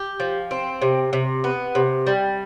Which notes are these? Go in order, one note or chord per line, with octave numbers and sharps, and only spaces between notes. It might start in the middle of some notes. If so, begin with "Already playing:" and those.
Already playing: G4
F3
C4
C3
C3
B3
C3
G3